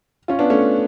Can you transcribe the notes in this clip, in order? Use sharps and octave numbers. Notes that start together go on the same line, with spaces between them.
C#4 F4
B3 D4
A3 C#4